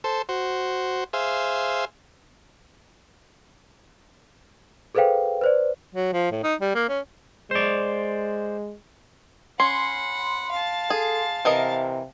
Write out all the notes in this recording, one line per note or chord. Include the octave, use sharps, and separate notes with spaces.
A4 C5
F#4 C5
G#4 C5 E5 F5
G#4 A4 B4 C5 F5 G5
B4 C5 D5
F#3
F3
A2
D#4
G3
A#3
C#4
G#3 C5 D5
C#4 F#5 B5 C6
F5 A5
G#4 A4
C3 E3 A#4 D#5